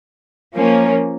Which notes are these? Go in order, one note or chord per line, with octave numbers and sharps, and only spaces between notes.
F3 A#3 C#4